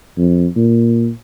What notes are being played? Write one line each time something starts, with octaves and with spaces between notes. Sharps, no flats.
F2
A#2